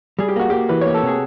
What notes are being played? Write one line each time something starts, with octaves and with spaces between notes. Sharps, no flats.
G3 G#4
G4
A#3 F#4
A#3 G4
E3 B4
A#3 C#5
A4
C3 G#4